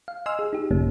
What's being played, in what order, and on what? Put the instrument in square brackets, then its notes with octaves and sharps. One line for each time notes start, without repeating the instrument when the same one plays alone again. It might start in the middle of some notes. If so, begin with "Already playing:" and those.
[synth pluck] F5
D#5 G#5 C6 E6 F6
G#4
D#4 G4
A1 F#2 C#3 A#3 C#4